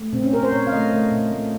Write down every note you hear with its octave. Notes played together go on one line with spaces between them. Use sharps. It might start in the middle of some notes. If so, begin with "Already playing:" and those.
Already playing: A3
A#2 C4
C#4
A#2 A#4
C5
A#2 C#5
F5
A3 D#5
A3
A#2
A3